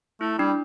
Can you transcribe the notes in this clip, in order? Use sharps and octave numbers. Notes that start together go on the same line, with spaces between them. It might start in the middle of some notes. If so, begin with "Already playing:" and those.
A3 E4
G3 D4